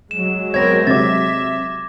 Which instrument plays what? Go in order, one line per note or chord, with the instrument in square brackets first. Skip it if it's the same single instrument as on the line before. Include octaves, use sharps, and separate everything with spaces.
[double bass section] F#3 G#3 [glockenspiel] E7
[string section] B3 C4 A#4 [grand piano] C#5 [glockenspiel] G#6 A#6
[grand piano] C3 [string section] E5 [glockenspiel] D6 A6